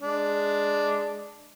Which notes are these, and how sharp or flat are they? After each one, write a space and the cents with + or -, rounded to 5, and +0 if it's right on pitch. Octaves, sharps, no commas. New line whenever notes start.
G#3 +0 D4 +0